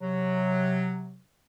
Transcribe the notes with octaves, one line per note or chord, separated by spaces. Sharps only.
C3 F#3